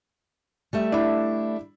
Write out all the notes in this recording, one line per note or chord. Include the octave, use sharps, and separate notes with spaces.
G3 A3 E5
D4 E4